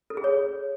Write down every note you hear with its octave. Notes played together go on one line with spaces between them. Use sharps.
A4
G#4
C#5